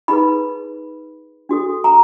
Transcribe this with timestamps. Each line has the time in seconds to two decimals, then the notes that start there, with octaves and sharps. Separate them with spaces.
0.08 D#4 G#4 B4 B5
1.49 D4 F#4 A4
1.84 A#5